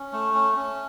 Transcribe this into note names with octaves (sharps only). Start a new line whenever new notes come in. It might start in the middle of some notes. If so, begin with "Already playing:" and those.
Already playing: C#4
A3
C#4
C#4